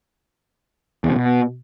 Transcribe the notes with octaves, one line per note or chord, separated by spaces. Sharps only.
E2
C3
B2